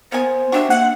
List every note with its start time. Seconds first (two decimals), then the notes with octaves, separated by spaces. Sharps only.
0.12 A#3 B3 C5 G#5
0.52 D4 F#4 G4 E5
0.70 A#3 F#5